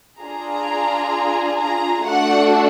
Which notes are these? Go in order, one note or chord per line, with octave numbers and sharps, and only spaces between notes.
D4 F4 G#4 A#5
A#5
A3 D4 F#4 A4 F#5